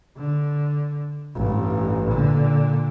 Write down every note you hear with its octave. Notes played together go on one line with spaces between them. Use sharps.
D3
A1 G2
A#2 D3